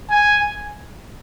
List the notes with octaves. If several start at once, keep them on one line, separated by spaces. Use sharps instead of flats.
G#5